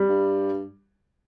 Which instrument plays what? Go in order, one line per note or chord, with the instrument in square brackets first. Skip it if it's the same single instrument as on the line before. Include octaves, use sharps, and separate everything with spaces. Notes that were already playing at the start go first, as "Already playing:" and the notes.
Already playing: [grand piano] G3
[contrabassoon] G2